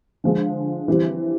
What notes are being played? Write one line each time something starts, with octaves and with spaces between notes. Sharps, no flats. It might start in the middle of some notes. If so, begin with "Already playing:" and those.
D3 F3 G#3
E3 G3 C4